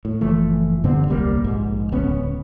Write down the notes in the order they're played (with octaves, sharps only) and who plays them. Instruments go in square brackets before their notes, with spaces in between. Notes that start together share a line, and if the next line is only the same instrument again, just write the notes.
[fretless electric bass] A2
F#1 E3 F3 A3
G2 D3 B3 C4
D#1 C2 G3 A#3
A#1 G#2
D1 C#2 B3 C#4